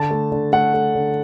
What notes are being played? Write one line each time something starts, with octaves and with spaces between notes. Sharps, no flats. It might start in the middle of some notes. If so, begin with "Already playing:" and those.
Already playing: D3 A5
A3
D3
A3 F#5
A3
D3